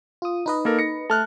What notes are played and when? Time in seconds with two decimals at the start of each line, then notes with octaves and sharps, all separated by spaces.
0.22 F4 D#6
0.46 D#4 B4 D#5
0.65 A#3 A4 A#4
0.79 A#6 C#7
1.10 A3 A5 F6 F#6